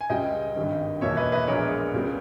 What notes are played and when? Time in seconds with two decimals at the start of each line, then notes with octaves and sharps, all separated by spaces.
0.01 G#5
0.10 C#2 C#3 G3 D#5 G5
0.56 G#1 G2 D#3
1.01 E2 B2 A#3 C#5 E5
1.17 B4 D#5
1.32 B4 D#5
1.47 A#1 A#2 G#3 B3 A#4 C#5
1.94 C#2 C#3 G3 B3